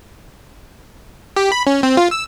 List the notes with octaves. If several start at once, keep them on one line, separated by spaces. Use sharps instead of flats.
G4
B5
C#4
C4
F4
E6